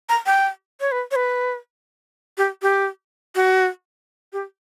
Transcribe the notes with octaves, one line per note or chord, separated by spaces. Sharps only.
A#5
G5
C#5
B4
C#5
B4
G4
G4
F#4
G4